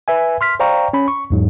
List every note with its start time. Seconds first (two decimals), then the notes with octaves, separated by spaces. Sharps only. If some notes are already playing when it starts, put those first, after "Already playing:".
0.08 B4 E5 G#5
0.41 C6 F6 B6
0.60 C5 D5 F5 G5 A#5 C#6
0.93 C#4 B5
1.08 C#6
1.30 E2 G#2 F#3